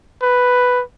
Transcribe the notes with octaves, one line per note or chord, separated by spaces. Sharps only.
B4